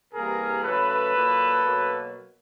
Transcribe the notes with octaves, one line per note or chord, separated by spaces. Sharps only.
C3 E3 G3 A#3 G#4 A#4
C#3 F#3 A3 A4 B4
A#2 F#3 A#3
B2 F#3 A#3